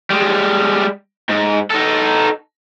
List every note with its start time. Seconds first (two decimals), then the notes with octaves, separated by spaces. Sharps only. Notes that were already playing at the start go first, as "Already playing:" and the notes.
0.10 G3 G#3
1.29 G#2
1.71 D#4 A4